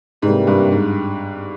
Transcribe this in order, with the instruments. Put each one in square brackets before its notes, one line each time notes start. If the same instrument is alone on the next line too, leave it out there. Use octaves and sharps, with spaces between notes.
[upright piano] G#2 [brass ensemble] C3 E3 G3 A#3
[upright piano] G2
G#2